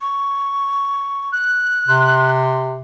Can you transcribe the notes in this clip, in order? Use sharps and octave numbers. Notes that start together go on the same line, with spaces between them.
C#6
F#6
C3 C6